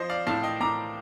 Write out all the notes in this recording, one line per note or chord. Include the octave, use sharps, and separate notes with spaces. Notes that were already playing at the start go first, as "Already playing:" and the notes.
Already playing: F3 C5 D#5
D5 F5
A2 F5 A5
D#5 G5
A2 A#5 D6